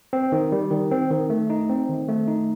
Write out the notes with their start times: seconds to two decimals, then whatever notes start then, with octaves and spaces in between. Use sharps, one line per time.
0.13 C4
0.32 D#3
0.52 G3
0.71 D#3
0.91 C4
1.10 D#3
1.30 A3
1.50 D#4
1.69 C4
1.89 D#3
2.08 A3
2.28 D#4